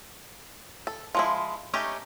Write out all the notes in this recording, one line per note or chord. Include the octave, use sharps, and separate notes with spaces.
A4
F3 G#3 E4
A3 C#4 D#4 G4